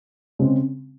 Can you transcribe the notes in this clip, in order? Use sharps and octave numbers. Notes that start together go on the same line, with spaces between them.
C#3 G#3 C4